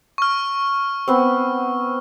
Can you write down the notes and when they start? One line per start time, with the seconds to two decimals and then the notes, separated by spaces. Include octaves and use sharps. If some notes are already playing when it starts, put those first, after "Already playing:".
0.18 C#6 F6
1.08 B3 C4